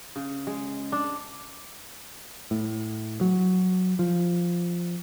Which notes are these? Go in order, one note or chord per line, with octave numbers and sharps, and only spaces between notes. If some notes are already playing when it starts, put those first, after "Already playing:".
C#3
G#3
D4
A2
F#3
F3